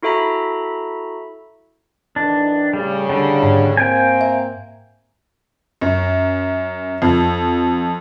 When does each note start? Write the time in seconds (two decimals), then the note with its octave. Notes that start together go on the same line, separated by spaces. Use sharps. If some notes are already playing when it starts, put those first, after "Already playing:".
0.03 E4 F#4 A4 E5 A#5 B5
2.16 A2 D#3 E3 D4
2.74 A2 C#3 G3
3.10 D3 G3
3.43 G#2
3.77 A#3 C4 G5 G#5
4.21 E5
5.81 F#2
7.02 F2